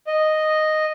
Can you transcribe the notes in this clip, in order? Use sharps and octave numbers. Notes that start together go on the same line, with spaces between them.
D#5